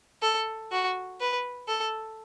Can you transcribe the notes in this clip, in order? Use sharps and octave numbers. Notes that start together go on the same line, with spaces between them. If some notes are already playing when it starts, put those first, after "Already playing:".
A4
F#4
B4
A4